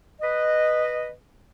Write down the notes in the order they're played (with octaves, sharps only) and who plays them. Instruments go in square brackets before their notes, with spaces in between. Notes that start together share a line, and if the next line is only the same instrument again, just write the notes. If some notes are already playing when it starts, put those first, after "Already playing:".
[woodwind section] B4 D#5